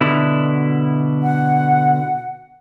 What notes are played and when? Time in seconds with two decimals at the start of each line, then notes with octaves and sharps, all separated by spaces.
0.01 B2 D3 E4
1.23 F#5